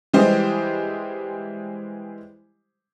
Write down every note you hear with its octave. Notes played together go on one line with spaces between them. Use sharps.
E3 G3 G#3 G4 C5 D#5